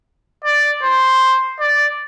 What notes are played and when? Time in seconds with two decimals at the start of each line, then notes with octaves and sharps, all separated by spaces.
0.44 D5
0.83 C5
1.60 D5